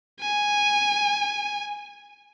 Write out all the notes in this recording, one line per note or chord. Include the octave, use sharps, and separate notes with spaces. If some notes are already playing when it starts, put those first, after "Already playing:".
G#5